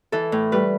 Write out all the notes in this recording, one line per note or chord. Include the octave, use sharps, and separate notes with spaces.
E3 A4
A2
G3 B4